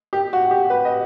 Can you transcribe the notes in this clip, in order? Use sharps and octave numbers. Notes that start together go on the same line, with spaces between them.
G4
F#4
G4
B4
D#5